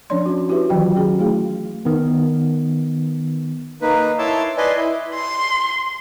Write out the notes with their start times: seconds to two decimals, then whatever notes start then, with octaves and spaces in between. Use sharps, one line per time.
0.10 F3 C#4 D4 C#5 D5 C6
0.26 C#4 F#4
0.49 E4 F#4 G4 B4 E5
0.70 D#3 E3 F#3 F4 G5
0.96 C#4 F#4 G#4
1.19 A3 E4 G#4 F5
1.85 D#3 B3
3.82 A#3 D#4 B4
4.19 E4 C#5 A5 C6 D6 E6
4.58 B4 D5 D#5 G#5 C6
4.77 E4
5.15 C6